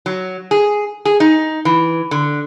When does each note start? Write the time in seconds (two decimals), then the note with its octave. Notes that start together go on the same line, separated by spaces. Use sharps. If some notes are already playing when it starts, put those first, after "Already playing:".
0.06 F#3
0.51 G#4
1.05 G#4
1.20 D#4
1.65 E3
2.11 D3